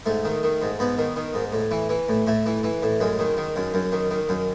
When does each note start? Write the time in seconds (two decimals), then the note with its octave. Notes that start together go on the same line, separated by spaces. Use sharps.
0.06 G#2 A3
0.25 D#3
0.43 D#3
0.62 G#2
0.79 G#2 B3
0.98 D#3
1.16 D#3
1.34 G#2
1.53 A2
1.71 E3
1.89 E3
2.09 A2
2.27 A2 A3
2.46 E3
2.63 E3
2.83 A2
3.00 F#2 G#3
3.19 D#3
3.37 D#3
3.56 F#2
3.74 F#2
3.92 D#3
4.11 D#3
4.29 F#2